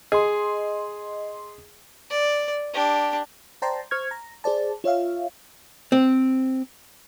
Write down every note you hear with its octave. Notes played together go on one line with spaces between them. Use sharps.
G#4 D#5 C6
D5
D4 G4
C5 D5 G5 A5 A#5 C6
C5 C#6 F6 G#6
A#5
G#4 C5 D5 A5
F4 C#5 E5 F5
C4